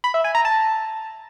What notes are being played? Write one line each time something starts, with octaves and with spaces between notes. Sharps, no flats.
B5
E5
G#5
A#5
A5